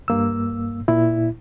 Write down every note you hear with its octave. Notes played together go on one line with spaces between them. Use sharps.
G2 A#3 E6
A#2 E4